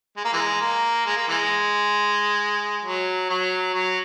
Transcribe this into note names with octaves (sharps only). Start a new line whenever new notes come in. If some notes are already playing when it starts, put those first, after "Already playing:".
G#3
A#3
E3 G#3
A#3
G#3
A#3
E3 G#3
F#3
F#3
F#3